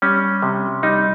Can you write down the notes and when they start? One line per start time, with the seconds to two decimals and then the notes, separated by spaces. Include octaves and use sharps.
0.02 G3 C#4
0.43 C3
0.83 G3 D#4